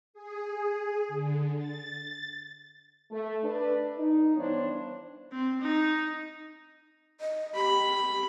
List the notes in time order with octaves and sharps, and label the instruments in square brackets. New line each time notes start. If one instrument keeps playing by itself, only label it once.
[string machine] G#4
D3
A6
[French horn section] A3
D4 B4
D#4
G2 E3 B3 D4 C5 C#5
[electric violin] C4
D#4
[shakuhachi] D#5
[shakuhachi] G4 [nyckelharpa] B5